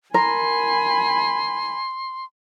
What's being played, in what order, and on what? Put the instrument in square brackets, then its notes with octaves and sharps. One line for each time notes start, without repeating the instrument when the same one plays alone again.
[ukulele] A#4 [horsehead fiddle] G#5 B5 [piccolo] C6